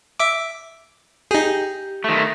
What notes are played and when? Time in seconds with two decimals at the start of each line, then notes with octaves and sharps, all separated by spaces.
0.20 E5 D6
1.31 D#4 G4 G#4
2.04 D#3 A3